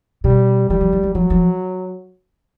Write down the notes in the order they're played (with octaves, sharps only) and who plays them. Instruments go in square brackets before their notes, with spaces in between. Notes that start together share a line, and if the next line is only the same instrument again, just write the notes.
[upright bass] B2 [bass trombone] G3
[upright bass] E3 [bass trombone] G3
[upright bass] F3
F3
F#3
[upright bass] F3 [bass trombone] F#3
[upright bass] F3